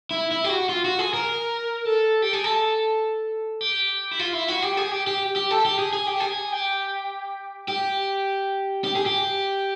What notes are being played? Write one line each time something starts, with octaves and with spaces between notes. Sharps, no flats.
E4
E4
G4
F#4
F4
F#4
G#4
A#4
A4
G4
G#4
A4
G4
E4
F4
E4
F#4
G4
G#4
G4
G4
G4
A4
G4
G#4
G#4
G4
G#4
G4
G4
G4
G#4
G4